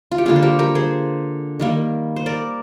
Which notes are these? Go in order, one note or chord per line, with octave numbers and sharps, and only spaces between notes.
F4
G4
D3 G3 A#3 F4 G#4
C5
G4 A#4
G4 A#4
G#4 C5
D#3 G3 A#3
C5
A#4 D5